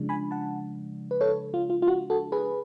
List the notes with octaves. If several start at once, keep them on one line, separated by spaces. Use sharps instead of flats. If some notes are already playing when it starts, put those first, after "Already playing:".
Already playing: C#3 F3 G#3 D4
G#5 B5
F#5 A5
B4
A4 C#5
F4
F4
F4
F#4
F#4 A4
G#4 B4